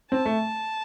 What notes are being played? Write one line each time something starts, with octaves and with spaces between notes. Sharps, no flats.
C4 A5
A3